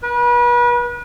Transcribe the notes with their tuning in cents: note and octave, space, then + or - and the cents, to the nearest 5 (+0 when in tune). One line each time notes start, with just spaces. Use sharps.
B4 -35